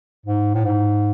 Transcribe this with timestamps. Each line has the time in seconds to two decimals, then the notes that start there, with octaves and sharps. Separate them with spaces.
0.26 G#2
0.54 A2
0.65 G#2